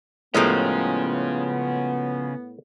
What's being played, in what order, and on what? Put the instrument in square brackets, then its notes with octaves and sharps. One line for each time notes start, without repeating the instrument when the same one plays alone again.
[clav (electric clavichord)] A2 A#4 [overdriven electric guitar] C#3 C#4 [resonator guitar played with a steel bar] F3 G3 G#3 [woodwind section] B3